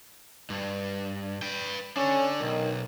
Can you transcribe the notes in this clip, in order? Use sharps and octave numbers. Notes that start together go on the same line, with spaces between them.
G2
B4 G5
C#4 D4 A4
B1 D#3